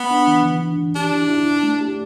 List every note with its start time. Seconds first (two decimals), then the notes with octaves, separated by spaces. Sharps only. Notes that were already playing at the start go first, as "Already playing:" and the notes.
Already playing: B3
0.11 D4
0.27 E3
0.45 E3
0.61 D4
0.78 E3
0.95 D4 G4
1.13 E4
1.29 E4
1.46 E4
1.63 A3
1.81 G4